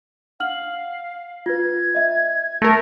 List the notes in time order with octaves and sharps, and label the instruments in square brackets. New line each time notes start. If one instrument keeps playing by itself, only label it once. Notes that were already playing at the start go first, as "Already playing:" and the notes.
[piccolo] F5 [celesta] F#5 F6 F#7
[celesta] F4 B4 [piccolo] G#6
[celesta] D#5 E5
[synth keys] A3 A#4 [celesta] A#6